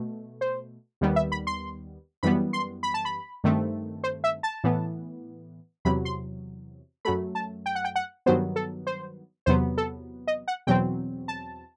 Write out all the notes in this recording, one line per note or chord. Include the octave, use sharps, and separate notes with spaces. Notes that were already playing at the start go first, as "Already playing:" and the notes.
Already playing: B2 A3
C5
D#2 D#3 G3 B3
E5
B5
C6
F#2 E3 G3 B3 B5
C6
B5
A5
B5
G2 D#3 A3 C4
C5
E5
A5
A2 E3 B3
E2 C3 F#3 B5
C6
F#2 F#3 A3 B5
A5
G5
F#5
G5
F#5
G2 D#3 F#3 B3 C5
A4
C5
E2 C3 F#3 B3 C5
A4
D#5
F#5
E2 B2 F#3 C4 G5
A5